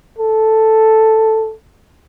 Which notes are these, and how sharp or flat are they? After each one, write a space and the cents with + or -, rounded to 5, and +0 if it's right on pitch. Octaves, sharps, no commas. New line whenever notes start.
A4 +0